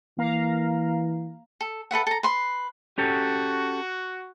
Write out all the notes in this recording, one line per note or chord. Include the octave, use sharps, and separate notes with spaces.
E3 A#3 F5 A#5
A4
A4 B4 E5 F#5
A4 A#5
B4 C6
C#4 F#4 G4 A4